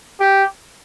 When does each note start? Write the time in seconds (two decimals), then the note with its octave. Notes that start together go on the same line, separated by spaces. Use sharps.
0.20 G4